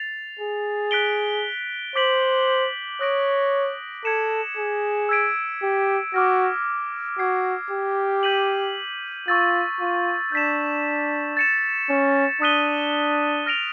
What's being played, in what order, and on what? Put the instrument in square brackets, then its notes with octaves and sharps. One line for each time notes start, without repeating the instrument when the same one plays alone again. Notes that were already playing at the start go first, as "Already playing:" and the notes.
Already playing: [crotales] A6 C7 F7
[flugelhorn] G#4
[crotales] F#6 B6 D7 G7
[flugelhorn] C5 [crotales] D6 G6 B6 D7 F#7
[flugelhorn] C#5 [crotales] D#6 F#6 A#6 D7
[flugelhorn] A4 [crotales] G#6 C#7 E7
[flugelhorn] G#4
[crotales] E6 G#6 B6 D7
[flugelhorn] G4
[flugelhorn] F#4 [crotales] D6 F6 A#6
[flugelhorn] F#4 [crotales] F6 G#6 C7
[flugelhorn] G4
[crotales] G6 B6 D#7 F#7
[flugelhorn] F4 [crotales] C#6 E6 A6
[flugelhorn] F4
[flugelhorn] D4 [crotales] G6 B6 E7
[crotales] A6 C#7 E7
[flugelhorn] C#4
[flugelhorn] D4 [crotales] D#6 F#6 B6 D#7 G7
[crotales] F6 A#6 D7 F7